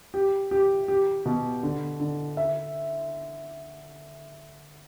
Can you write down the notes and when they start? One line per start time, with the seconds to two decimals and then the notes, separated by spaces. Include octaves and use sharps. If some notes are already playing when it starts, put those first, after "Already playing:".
0.14 G4
0.51 G4
0.88 G4
1.25 B2
1.63 D3
2.00 D3
2.37 E5